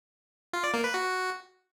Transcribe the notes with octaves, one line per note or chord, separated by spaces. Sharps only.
F4
D5
A#3
B4
F#4